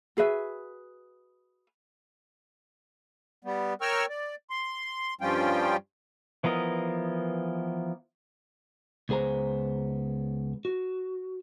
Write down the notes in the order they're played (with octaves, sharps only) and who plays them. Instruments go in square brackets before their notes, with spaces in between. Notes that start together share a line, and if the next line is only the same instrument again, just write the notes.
[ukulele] F#4 G#4 B4 E5
[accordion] G3 B3
A#4 C#5 G5 C#6 E6 F6
D5
C6
G2 F3 G3 C#4 F4 G5
[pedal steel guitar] E3 F3 B3 A#4 D#5
[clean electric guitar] C#2 B3 G#4 C5 A#5
F#4